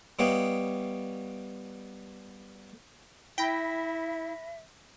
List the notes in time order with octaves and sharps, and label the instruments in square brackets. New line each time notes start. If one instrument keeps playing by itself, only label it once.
[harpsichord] G3 B3 C#5 D#5 F5 G5
[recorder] E4 [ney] E5 [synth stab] G5 [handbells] B5 A#6 B6